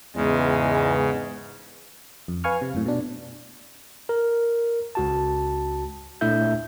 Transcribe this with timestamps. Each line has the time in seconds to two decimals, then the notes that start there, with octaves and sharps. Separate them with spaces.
0.16 E2 G#2 C#3 G#3 B3
2.28 F2
2.44 B4 F5 G#5 C#6 F6
2.61 C3
2.74 F#2 A2
2.86 B2 D4
4.09 A#4
4.95 C#2 F#4 A5
6.21 A#2 A3 D4 E4 E5 G6